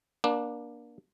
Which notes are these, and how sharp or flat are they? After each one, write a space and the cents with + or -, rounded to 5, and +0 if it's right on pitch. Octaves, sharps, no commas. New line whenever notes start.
A#3 +30 D4 +0